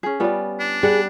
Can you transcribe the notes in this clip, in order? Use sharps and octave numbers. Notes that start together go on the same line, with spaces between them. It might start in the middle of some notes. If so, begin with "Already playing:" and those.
C#4 G#4
G3 B3 C#4 F4 D5
D4
G3 G#4 F#5